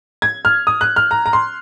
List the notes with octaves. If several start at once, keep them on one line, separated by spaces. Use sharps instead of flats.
G#6
F6
D#6
F#6
F6
A#5
A#5
C6